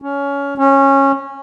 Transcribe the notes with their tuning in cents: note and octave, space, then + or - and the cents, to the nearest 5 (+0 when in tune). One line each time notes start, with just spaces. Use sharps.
C#4 +20
C#4 -15